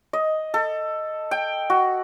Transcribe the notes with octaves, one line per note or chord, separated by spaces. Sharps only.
D#5
A4
G5
F#4